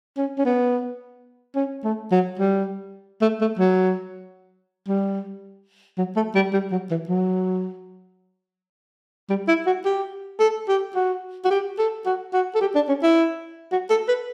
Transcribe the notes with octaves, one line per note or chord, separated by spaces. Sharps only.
C#4
C#4
B3
C#4
A3
F#3
G3
A3
A3
F#3
G3
F#3
A3
G3
G3
F#3
E3
F#3
G3
E4
F#4
G4
A4
G4
F#4
F#4
G4
A4
F#4
F#4
A4
G4
D4
C#4
E4
F#4
A4
B4